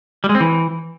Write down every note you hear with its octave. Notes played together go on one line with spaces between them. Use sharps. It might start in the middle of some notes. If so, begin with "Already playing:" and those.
G3
G#3
C4
E3